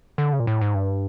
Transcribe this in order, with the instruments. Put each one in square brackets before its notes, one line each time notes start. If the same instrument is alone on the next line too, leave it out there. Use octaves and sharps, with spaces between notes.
[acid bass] D3
C#3
A#2
A2
G#2
G2